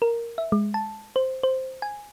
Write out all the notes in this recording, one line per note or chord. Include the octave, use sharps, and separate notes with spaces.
A#4
E5
G#3
A5
C5
C5
G#5